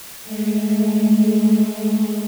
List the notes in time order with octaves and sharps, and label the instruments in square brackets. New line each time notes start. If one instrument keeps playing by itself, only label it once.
[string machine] G#3 A3